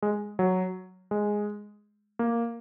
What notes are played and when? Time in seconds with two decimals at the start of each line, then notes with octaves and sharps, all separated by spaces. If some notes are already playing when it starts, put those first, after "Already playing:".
0.02 G#3
0.39 F#3
1.11 G#3
2.19 A#3